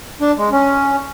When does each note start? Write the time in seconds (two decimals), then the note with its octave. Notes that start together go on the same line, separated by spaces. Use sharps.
0.21 D4
0.38 G#3
0.52 C#4